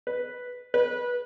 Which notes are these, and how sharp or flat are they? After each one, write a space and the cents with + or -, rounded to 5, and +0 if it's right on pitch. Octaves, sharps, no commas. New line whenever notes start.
B4 -5
B4 -20